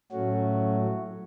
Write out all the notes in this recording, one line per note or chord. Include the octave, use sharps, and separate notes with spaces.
A2 F#3 A3 C#4 F#4